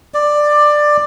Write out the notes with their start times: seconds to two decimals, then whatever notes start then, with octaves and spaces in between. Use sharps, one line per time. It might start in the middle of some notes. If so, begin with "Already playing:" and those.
0.14 D5